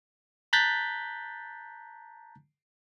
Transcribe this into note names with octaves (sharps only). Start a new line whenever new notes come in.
A5 A#5 F#6 G6 A6 B6